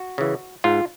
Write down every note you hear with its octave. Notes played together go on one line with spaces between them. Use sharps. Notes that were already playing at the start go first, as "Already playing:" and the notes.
Already playing: F#4
C#3 E3
G#2 F4